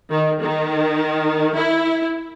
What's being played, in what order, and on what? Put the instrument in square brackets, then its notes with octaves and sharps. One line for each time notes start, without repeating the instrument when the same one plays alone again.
[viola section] D#3
D#3
E4